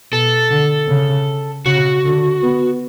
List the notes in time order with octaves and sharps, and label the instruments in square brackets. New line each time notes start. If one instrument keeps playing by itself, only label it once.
[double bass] B2 [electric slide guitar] A4
[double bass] D3
C#3
[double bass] C#3 [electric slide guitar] F#4
[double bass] D3
B3